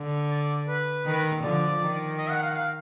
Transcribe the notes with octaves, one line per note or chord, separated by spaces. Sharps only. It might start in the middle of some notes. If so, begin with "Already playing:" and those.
Already playing: D3
D5
B4
D#3
D3 F3 D5
D#3
D#5
F#5
F5
F#5
F5